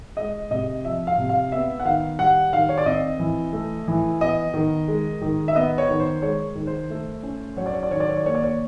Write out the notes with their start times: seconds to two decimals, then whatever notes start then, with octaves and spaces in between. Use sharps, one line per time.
0.17 G#3 D#5
0.51 C3 D#5
0.85 F3 E5
1.07 F5
1.18 C3
1.29 F5
1.52 B3 E5
1.80 F#5
1.85 D#3 F5
2.19 G3 F#5
2.53 D#3 F5
2.69 C#5
2.78 D5
2.86 C4 D#5
3.19 E3
3.53 A3
3.88 E3
4.21 B3 D#5
4.54 D#3
4.88 G#3
5.22 D#3
5.48 E5
5.55 B3 D#5
5.78 C#5
5.89 D#3
6.00 C5
6.22 G#3 C#5
6.55 D#3
6.67 C5
6.90 A3
7.23 C#4
7.56 F#3 C#5
7.66 D5
7.74 C#5
7.83 D5
7.90 D#3 C#5
8.00 D5
8.09 C#5
8.17 D5
8.24 A#3 C#5
8.35 D5
8.44 C#5